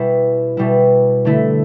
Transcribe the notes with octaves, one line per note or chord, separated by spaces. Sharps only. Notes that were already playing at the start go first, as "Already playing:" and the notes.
Already playing: B2 G3 E4
B2 G3 E4
D3 A3 E4